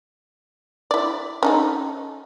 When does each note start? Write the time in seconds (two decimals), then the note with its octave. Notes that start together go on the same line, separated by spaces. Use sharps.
0.91 E4 D5
1.43 C#4 D#4 A4